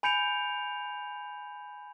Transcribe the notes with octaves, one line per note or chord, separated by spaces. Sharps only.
G#5 B5 G6 C#7 D7 F7